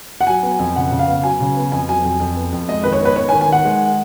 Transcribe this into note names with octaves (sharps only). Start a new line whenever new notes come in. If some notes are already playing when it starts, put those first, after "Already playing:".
F#5
F#3 G#5
B3
F2
C#3 F#5
C#3
F5
B3
F#3 G#5
C#3
B3
F2 G#5
F#3 G#5
F2
F2
B3
F2
G#3 D#5
D#3 B4
C#5
B3
B4
B3 C#5
G#5
D#3
G#5
D#3 F#5
G#3